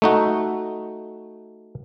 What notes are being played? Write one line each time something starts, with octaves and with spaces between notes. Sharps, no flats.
A3 D#4 F#4